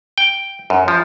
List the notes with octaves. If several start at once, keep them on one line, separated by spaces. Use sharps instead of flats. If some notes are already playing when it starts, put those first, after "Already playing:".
G5
F#2
F3